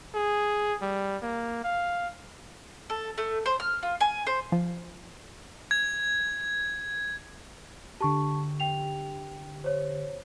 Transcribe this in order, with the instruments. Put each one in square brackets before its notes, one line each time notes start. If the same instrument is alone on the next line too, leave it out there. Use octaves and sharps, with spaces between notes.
[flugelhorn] G#4
G3
A#3
F5
[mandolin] A4
A3
C5
F6
F4
G#5
C5
[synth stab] F3
[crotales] G#6
[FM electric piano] D3 G4 [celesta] A5 C#6
[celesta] G5 F7
C5 C#5